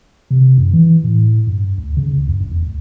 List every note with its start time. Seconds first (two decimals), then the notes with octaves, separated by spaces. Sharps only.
0.30 C3
0.58 F#2
0.73 E3
1.04 A2
1.47 G2
1.78 D2
1.97 C#3
2.11 D2
2.27 G2
2.40 E1
2.52 E2
2.66 D2